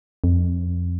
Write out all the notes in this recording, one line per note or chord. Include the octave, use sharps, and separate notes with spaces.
F2